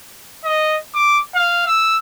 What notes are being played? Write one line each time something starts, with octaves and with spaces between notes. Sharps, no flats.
D#5
D6
F5
E6